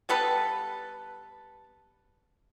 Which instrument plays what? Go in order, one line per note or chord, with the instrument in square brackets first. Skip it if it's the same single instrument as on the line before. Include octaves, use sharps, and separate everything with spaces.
[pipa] G3 B3 A4 B4